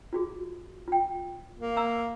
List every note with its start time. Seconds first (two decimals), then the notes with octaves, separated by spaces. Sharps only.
0.13 F4 F#4 G#4
0.88 F4 G5
1.60 A#3
1.76 E5 A#5 E6